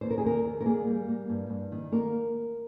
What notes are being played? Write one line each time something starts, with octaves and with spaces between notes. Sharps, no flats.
D#2 C5
A#4
G#4
D#2 A#4
D#2
A#4
A#3 G#4
G3
A#3
G2
G2
D#3
A#3 A#4